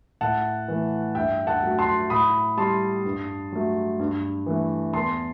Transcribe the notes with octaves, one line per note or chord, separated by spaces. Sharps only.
A2 F#5 A5
E3 A3
G2 E5 G5
F#5 A5
F#3 A3
A5 C6
A2 B5 D#6
G3 A5 C6
G2
F#3 A3
G2
E3 A3
E2 A5 C6